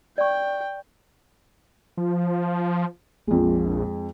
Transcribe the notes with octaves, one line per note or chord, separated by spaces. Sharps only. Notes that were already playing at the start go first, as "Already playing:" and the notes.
D5 G5 C#6
F3
A#1 F2 G#3